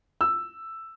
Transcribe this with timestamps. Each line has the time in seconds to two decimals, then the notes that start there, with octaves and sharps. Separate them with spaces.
0.21 E6